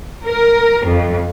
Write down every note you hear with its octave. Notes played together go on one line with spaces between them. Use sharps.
A#4
F2